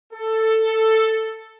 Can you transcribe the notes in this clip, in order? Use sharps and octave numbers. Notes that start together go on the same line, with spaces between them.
A4